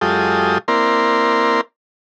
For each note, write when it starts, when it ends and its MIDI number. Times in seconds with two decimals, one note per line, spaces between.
0.01 0.58 42
0.01 0.58 56
0.01 0.58 65
0.01 0.58 67
0.01 0.58 69
0.01 0.58 87
0.68 1.61 58
0.68 1.61 60
0.68 1.61 64
0.68 1.61 70
0.68 1.61 74
0.68 1.61 84